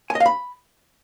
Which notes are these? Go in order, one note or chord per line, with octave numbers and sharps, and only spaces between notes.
G#5
D#5
F5
B5